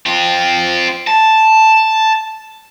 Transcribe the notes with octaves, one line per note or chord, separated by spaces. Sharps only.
C4 F4
A5